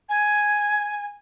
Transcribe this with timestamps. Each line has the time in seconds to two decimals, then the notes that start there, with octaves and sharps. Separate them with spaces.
0.09 G#5